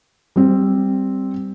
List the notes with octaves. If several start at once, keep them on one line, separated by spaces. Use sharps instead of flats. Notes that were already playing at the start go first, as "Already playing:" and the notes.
G3 C4